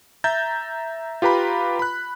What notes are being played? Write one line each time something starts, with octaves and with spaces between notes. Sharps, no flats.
E5 A#5 G6 A6
F4 G4 B4 A#5 B5
B5 F#6